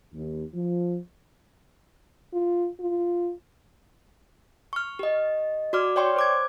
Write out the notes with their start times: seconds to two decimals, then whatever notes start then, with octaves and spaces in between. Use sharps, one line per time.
0.14 D#2
0.54 F3
2.34 F4
2.80 F4
4.73 C#6 F6
4.99 G4 D#5
5.73 F#4 D5 D6 F6
5.96 C#5 D5 G5 C6 C#6
6.16 C5 D6 G#6